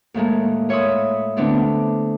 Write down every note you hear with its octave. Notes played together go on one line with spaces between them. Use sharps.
D#2 A2 G#3 A#3
F4 C#5 E5 B5 C6 D#6
D3 A3 B3 C4 D4 E4